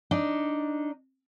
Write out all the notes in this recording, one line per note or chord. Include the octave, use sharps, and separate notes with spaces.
D4 D#4